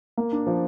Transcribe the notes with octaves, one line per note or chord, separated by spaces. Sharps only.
A#3
D4
F3